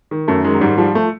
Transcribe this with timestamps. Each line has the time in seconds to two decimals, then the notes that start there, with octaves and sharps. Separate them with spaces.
0.11 D#3
0.28 F#2 A3
0.44 D#3 G#3
0.54 F#3
0.61 G#2 G3
0.78 F3 G3
0.95 A3